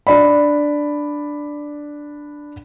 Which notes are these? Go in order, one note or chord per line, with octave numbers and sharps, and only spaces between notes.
D4 D5 B5